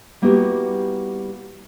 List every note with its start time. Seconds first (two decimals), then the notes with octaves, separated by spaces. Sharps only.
0.22 G3 A#3 B3 E4 F#4 G4